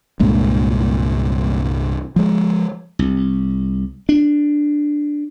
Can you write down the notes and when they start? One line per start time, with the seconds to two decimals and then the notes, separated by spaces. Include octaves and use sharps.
0.20 C2 G2 A#2 G#3
2.16 F3 G#3
2.99 C2
4.09 D4